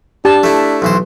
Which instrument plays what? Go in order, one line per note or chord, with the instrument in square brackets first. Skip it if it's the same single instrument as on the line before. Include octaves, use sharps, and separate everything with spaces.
[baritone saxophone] D4 [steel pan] G4 A5
[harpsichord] A3 E4
B1 E3 C5